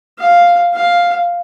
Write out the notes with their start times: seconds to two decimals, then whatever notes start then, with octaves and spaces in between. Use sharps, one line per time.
0.19 F5
0.74 F5